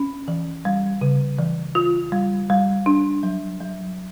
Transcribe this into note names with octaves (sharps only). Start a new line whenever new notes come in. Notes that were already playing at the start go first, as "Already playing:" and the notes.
Already playing: C#4
E3
G3
C#3
E3
F4
G3
G3
D4
F#3
F#3